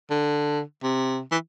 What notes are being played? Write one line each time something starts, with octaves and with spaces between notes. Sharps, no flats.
D3
C3
E3